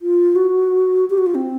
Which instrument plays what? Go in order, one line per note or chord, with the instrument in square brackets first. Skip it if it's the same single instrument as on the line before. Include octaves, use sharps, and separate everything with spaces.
[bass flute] F4
F#4
G4
F#4
F4
C4